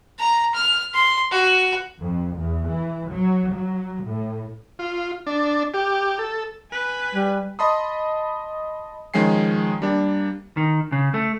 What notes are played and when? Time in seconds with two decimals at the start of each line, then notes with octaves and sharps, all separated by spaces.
0.19 A#5
0.55 F6
0.94 C6
1.31 F#4
1.99 F2
2.37 E2
2.68 E3
3.10 F#3
3.52 F#3
4.04 A2
4.79 F4
5.27 D4
5.74 G4
6.19 A4
6.71 B4 G#5
7.15 G3
7.59 D#5 A5 B5 C6 D#6
9.14 D#3 F3 G#3 C#4 G#5 C7
9.82 G3 A#3 D4
10.57 D#3
10.92 C#3
11.14 A3